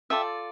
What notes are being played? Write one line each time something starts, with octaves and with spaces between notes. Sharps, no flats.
F4 A4 D5 E5 G5